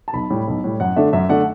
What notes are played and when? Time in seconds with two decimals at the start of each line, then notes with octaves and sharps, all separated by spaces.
0.08 A5
0.13 B1 B5
0.30 A2 G3
0.47 B1
0.64 A2 G3
0.80 F#2 F#5
0.96 D3 A3 D4 E5
1.13 F#2 E5
1.29 D3 A3 D4 F#5